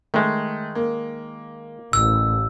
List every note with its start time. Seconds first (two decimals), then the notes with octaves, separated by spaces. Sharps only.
0.14 D#3 G#3 A3
0.75 A#3
1.93 A1 E6